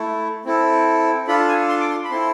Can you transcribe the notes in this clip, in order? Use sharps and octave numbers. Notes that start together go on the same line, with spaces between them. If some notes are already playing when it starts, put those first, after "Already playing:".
Already playing: A3 E4 A4
C4 E4 A4
D4 F4 A4 B5
G#5
C6
D6
C6
B5
C4 E4 A4 C6